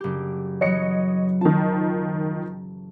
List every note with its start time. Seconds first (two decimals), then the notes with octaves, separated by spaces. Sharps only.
0.01 F#1 G4
0.61 E3 F#3 C#5 D#5 C#7
1.41 D#3 F3 A5